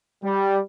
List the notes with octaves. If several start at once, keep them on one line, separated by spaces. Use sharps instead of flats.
G3